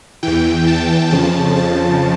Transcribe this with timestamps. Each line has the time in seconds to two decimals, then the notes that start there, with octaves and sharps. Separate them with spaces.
0.23 E2 E3 G5
0.67 A5
1.11 F2 C#3 F3 A5
1.56 A5